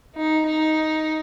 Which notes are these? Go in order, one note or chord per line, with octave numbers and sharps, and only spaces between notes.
D#4
D#4